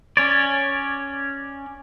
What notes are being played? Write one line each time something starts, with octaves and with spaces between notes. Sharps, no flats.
C#4 C#5 D5